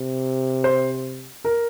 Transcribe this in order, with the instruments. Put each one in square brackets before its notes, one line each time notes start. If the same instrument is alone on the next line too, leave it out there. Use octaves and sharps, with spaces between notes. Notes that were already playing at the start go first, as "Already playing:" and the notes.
Already playing: [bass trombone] C3
[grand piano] C5
A#4